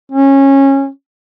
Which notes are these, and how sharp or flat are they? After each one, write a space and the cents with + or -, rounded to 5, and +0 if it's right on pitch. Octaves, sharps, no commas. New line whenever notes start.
C#4 -20